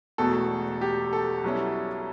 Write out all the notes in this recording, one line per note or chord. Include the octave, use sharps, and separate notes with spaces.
E1 E2 B2 A3 A4
G4
A4
B1 B2 G3 C#4 E4